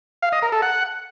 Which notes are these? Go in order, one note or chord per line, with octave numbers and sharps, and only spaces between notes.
F5
D#5
A#4
A4
F#5